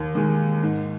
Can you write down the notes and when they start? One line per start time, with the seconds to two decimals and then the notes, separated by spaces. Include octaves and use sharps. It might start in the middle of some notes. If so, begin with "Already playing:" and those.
Already playing: D#2
0.15 D#3 G#3
0.63 G#2